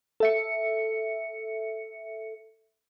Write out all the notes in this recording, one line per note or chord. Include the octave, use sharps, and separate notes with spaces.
A4 E5 C#7